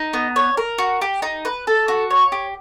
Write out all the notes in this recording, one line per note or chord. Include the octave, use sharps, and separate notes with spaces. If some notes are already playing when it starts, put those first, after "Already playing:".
Already playing: D#4
B3
C#5
A#4
F#4
G4
D#4
B4
A4
F#4
C#5
G4